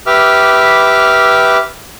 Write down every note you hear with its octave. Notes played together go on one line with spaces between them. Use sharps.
G4 B4 E5 D6 F6